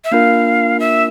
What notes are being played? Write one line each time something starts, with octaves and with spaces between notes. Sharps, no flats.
E5
A#3 D4 F4 A#4 F5
E5